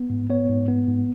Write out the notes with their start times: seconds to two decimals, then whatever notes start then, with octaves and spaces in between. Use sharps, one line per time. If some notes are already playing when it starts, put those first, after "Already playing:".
Already playing: B3
0.10 G#2
0.30 B3 C#5
0.49 G#2
0.68 B3
0.87 G#2